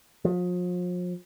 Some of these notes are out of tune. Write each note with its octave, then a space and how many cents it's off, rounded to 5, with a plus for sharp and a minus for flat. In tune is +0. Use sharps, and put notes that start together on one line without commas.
F3 +40